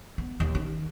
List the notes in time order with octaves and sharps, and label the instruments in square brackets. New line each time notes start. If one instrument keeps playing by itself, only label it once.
[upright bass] B3
D#2
D#3